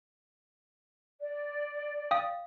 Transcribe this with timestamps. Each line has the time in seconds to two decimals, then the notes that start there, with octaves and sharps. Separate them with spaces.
1.20 D5
2.11 F5 G5 D#6